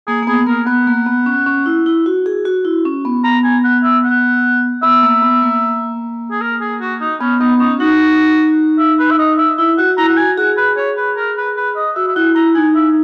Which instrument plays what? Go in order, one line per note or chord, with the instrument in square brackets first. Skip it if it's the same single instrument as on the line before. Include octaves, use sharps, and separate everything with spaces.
[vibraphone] A#3 [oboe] G#4
[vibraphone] A#3
[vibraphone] B3 [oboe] G#4
[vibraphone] A#3 [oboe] A#4
[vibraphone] B3 [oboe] F#5
[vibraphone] A#3
B3
C#4
C#4
E4
E4
F#4
G#4
F#4
E4
C#4
B3
[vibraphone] B3 [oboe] A#5
[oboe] G#5
F#5
E5
F#5
[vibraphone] B3 [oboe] E5
[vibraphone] A#3
B3
A#3
[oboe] G#4
A#4
G#4
F#4
D#4
[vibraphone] B3 [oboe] C#4
[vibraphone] B3 [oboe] D#4
[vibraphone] C#4 [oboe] D#4
[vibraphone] D#4 [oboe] F#4
[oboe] E5
B4
E5
D#5
E5
[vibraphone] E4 [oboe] E5
[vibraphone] F#4 [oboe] F#5
[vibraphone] E4 [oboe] A#5
[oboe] F#5
[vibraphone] F#4 [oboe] G#5
[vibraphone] G#4 [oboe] F#5
[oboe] B4
C#5
B4
A#4
B4
B4
D#5
[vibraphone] F#4 [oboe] E5
[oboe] E5
[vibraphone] E4 [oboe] F#5
[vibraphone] E4 [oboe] A#5
[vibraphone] D#4 [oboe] G#5
[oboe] E5